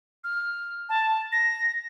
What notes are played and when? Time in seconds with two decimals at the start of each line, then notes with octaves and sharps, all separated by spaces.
0.24 F6
0.89 A5
1.32 A#6